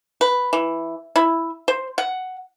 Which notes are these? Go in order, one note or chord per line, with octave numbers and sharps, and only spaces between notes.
B4
E3
E4
C5
F#5